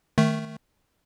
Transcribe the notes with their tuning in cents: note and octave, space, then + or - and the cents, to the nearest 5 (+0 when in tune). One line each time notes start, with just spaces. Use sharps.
D#3 +0 A3 +0